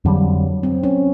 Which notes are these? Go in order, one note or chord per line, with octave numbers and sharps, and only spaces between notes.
F2 D3 F#3 G3
C4
C#4